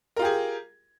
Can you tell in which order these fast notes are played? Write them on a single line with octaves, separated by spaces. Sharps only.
A#4 F4 G4 G#4